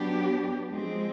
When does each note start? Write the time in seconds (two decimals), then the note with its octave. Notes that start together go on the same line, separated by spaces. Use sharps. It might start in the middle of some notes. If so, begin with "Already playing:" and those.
Already playing: F#3 B3 D4 G4
0.70 F3 G#3 C4